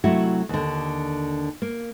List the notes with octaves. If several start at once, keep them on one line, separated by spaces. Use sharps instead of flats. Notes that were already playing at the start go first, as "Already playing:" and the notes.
C3 F#3 A3 E4 F#4
D#2 D3
A#3